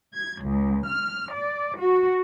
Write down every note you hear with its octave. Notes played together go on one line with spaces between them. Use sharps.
G#6
C#2
F6
D5
F#4